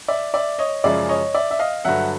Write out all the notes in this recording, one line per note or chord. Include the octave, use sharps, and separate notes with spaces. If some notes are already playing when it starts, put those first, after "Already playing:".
D5 E5
D5 E5
C#5 D#5
F#2 C#3 F3 G#3 D5 E5
C#5 D#5
D5 E5
E5
D#5 F5
G2 D3 F#3 E5 F#5